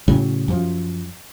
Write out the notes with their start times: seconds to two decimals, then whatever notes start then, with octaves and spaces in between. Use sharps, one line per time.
0.08 A2 C#3 F#3
0.48 F#2 F3